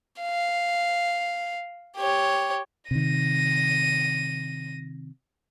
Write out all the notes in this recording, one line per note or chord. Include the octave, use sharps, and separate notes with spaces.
F5
G4 C#5
C3 D#3 A#6 D#7